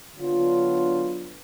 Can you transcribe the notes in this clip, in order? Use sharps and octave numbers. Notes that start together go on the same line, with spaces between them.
D3 F#3 B3 D4 F4